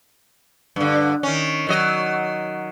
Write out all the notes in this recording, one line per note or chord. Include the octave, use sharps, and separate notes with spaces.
G2 D3
D#3 C#4
D#3 F#3 D#5